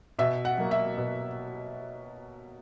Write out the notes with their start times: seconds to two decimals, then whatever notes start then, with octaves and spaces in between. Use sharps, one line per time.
0.19 B2 E5
0.45 F#5
0.58 F#3 A#3
0.71 E5
0.97 B2